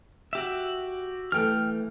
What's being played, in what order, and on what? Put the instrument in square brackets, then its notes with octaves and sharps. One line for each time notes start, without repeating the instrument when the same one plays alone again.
[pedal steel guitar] F#4 G4 E5
[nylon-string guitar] E3 A3 [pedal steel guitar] G5 F6